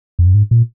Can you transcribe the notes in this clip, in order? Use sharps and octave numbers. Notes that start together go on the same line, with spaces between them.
F2
F#2
G#2
A#2